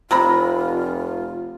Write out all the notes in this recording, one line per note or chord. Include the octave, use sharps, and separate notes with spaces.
F1 C3 F4 A#5 B5